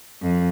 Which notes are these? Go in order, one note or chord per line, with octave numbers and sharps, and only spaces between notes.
F2